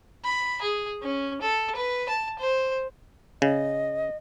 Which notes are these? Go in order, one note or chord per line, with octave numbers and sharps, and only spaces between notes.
B5
G#4
C#4
A4
B4
A5
C5
C#3 D#5